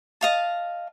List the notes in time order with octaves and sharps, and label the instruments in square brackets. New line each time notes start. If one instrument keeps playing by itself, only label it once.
[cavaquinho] D#5 F5 A5